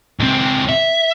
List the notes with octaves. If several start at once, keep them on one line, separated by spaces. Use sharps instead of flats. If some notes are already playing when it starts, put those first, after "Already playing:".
C#2 C4
E5